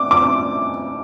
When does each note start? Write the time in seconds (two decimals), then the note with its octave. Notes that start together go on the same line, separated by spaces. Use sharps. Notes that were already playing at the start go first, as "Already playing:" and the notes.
Already playing: D6
0.11 D6